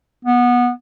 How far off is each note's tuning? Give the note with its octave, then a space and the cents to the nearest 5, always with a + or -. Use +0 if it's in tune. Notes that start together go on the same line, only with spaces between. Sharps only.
B3 -15